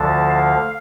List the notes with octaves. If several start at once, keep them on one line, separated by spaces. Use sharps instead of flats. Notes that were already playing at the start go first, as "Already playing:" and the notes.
Already playing: D2 D3 F3 A5
F5